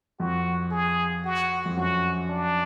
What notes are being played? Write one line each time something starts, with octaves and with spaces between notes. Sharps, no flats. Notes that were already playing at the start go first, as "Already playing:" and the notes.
F2 F#4
G#4
F#4
F2
F#2 F#4
D4